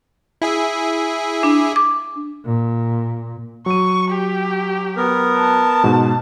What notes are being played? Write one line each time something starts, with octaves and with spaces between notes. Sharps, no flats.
E4 G#4 E5
D4
D6
A#2
F#3 C#6 D#7
G4
B3 A#4
A5
G#2 B2